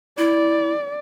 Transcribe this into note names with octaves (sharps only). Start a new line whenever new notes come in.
E4 D5